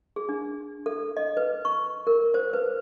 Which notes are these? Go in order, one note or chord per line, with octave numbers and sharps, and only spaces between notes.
G#4
D4
A4
D#5
B4
C#6
A#4
C5
B4